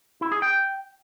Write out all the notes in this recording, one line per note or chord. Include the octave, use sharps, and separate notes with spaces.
E4
G#4
G5